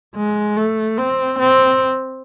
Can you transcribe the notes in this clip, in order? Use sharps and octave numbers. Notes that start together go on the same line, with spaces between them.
G#3
A3
C4
C4